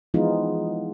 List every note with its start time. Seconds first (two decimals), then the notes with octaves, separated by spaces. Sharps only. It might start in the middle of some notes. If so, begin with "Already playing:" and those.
0.14 E3 F3 G#3 B3 D#4 F4